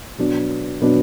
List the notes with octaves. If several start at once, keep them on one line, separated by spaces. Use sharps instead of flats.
B2 F#3 B3 D4
B2 F#3 B3 D4